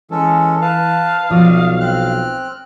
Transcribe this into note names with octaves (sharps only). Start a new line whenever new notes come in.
E3 G#3 C#4 A4
B4 F5 A5
B1 F3 F#4 D5 D#6
C4 F6 F#6